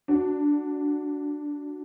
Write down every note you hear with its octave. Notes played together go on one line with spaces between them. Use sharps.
D4 F#4